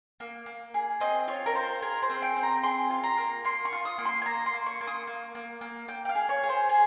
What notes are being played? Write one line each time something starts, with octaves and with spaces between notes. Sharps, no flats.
A#3
A#3
G#4
C4 D#5
F4 C#5
A#4
F4 C5
G#4 A#4
C5
C4
G5
C4
A#5
G#4 C6
F4
A#5
A#3
A#3 C6
C#6
F4
D#6
A#3
C6
G#5
A#3 A#5
C6
A#3
C#6
A#3
D#6
A#3
A#3
A#3
A#3 G5
G5
F5
G#4
C#5
G#4
C5
G#4